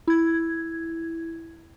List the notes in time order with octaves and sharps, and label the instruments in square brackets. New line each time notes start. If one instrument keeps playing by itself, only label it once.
[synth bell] E4 G#6